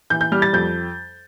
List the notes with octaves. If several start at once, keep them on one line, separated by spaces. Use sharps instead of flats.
E3 G6
G6
G3 F6
A6
F2 G6